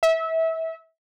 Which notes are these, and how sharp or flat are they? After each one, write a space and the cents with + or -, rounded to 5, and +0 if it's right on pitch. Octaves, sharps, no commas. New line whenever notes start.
E5 -25